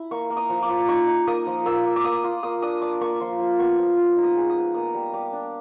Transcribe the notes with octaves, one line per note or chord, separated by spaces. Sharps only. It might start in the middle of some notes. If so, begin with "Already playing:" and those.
Already playing: E4
A#3 C#6
A#3
D#6
F3
D6
F3
D#4 C#6
D#4
A#3 D#6
F3
A#3 E6
A#3
D6
A#3 D#6
F4
A#3 D#6
D4 D#6
D4 D6
A#3 C#6
F3 C6
F3
B3 C#6
F3
F3
D#4
D#6
G#3
D#6
B3
A#3 D#6
G3
G3 D6
D4